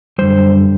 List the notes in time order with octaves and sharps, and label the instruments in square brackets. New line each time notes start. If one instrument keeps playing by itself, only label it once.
[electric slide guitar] F#2 D3 G3 C5